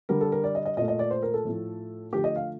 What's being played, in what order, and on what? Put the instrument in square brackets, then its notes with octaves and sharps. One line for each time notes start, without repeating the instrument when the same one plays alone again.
[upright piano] D3 G3 A#4
A4
A#4
D5
D#5
D#5
A#2 A3 D#5
D#5
D5
C5
A#4
A4
A2 F3 A3
D3 F3 A3 G4
D#5
F5